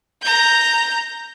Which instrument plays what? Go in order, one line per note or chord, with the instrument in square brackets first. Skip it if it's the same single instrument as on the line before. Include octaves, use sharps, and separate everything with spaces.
[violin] A#5 G6